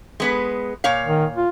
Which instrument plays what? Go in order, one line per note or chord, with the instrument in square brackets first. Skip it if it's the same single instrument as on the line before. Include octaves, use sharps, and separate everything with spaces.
[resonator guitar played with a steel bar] G#3 B3 B4
A#2 C#5 F5
[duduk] D#3
F4